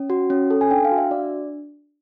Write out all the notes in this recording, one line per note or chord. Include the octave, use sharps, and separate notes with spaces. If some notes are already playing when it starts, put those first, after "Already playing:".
Already playing: C#4
F#4
C#4
A4
G#5
D4 G5
F5
F#4
E5
D4 D5